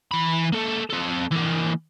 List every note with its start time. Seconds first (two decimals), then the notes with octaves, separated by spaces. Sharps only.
0.11 E3 B5
0.52 A#3 A4
0.90 C4 A4
1.31 E3 A#3